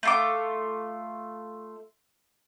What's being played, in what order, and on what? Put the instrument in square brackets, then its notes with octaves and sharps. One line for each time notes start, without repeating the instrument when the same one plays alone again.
[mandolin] A3 F4 D6